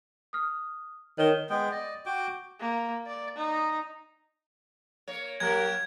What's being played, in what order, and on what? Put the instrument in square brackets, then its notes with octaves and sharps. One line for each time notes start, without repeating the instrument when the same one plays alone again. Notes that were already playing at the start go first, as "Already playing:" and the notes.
[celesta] D#6 F6
[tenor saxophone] D#3 [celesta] C#5 G7
[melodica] G#3 B3 G5
D5 D#5
F#4 G5 D6
[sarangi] A#3
D5
D#4
[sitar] A#3 C#5
[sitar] F#3 A#3 [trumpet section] G4 A#4 [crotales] G#6